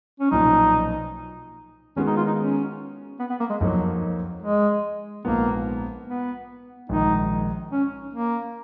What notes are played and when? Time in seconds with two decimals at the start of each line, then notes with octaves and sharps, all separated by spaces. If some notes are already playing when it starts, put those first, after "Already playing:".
0.20 C#4
0.31 B1 A#2 F3 D#4
1.96 D#3 G#3 B3 C#4 F#4
2.07 D#4
2.17 F4
2.27 D#4
2.38 C#4
3.19 B3
3.30 B3
3.40 A#3
3.50 G#3
3.60 F2 F3 F#3 A#3 D#4
4.43 G#3
5.25 A#1 G#2 F3 A#3 B3
6.07 B3
6.89 A#1 G#2 D#3 D#4
7.71 C#4
8.14 A#3